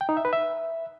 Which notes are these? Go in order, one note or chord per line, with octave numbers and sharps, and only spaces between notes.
G5
D#4
E5
B4
E5